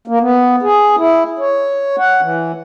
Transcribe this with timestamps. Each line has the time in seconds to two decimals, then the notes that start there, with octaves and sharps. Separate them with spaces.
0.08 A#3
0.20 B3
0.63 G#4
0.97 E4
1.39 C#5
1.99 F#5
2.21 E3